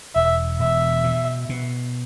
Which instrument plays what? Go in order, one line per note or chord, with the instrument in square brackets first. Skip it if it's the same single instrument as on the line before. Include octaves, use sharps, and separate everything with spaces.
[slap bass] E1 [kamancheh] E5
[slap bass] E1 [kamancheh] E5
[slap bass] B2
B2